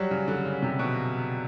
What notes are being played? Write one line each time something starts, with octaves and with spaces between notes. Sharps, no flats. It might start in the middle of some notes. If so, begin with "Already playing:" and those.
Already playing: F#3 G3
C#3
D3
C#3
C3
B2